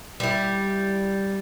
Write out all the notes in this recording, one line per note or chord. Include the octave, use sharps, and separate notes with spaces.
G3 E4